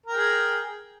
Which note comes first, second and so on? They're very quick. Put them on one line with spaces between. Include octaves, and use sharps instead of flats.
A#4 G5 G#4